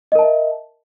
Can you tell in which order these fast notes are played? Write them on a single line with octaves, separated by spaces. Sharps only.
D#5 A#4 A5 E5